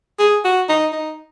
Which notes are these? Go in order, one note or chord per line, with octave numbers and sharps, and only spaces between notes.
G#4
F#4
D#4
D#4